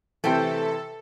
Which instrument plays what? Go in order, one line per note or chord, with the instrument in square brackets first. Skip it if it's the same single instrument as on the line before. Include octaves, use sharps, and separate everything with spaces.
[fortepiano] C3 E3 [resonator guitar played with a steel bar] A3 C5 G5 [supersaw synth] A4